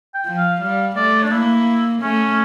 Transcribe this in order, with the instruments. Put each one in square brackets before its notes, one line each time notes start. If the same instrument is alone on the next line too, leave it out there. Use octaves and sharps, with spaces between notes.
[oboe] G5
[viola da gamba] F3
[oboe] F5
[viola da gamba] G3 [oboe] F5
[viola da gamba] A3 [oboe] D5
[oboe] D4
[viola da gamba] A#3 [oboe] E4
[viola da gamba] A3 [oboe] C#4